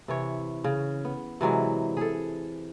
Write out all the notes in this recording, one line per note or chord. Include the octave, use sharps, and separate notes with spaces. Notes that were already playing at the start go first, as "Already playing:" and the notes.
C3 E3 C#5
C#3
B3
C3 E3 F#3 G#3
G#4 A4